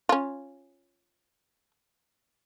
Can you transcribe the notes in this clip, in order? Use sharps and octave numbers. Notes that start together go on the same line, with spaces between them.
C#4 F4